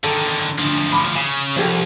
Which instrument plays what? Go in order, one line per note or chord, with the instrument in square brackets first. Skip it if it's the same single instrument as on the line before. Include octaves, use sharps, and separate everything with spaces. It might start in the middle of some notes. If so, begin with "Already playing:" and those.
[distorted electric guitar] D3 D#3 [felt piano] A4
[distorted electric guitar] D2 F3 [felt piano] D3
[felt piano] B5 D6
[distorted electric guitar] C#3 [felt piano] G#5
[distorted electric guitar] C2 [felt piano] F3 G4 A4